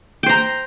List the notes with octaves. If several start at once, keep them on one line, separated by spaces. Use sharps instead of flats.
C5 G5 A#5